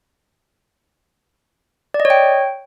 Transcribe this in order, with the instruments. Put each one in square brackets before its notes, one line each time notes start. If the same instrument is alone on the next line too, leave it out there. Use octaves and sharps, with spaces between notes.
[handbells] D5
D#5
C#5
G5